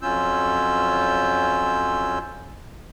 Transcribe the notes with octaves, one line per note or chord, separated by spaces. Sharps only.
F2 F#3 C#4 F4 E6 G6